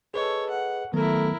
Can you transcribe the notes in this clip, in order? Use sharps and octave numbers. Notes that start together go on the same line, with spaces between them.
G#4 A4 B4 C#5 D#5
F#5
D#3 F#3 A3 B3 E4 A#4